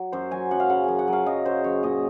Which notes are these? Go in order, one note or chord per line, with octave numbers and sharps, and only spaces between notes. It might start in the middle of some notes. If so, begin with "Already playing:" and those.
Already playing: F#3
F#2 C5
F#3 G#5
F#2 F#5
F5
C#3 F#5
F#2 G#5
F#5
F#3
F5
F#2 D#5
C#3 C5
F#2 C#5
A#2 D#5